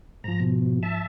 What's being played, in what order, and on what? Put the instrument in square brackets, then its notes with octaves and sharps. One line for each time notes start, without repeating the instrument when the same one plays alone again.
[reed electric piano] G#2 F3 [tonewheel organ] A#5
[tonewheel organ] B2
E5 A5